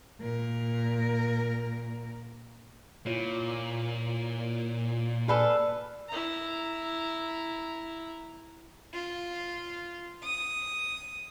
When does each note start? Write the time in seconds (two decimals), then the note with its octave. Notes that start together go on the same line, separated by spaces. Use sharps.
0.20 A#2 A#4
3.06 A#2 E4 F4 C#5
5.28 A4 B4 D5 F5 G#5
6.09 E4 A#5
8.94 F4
10.24 D#6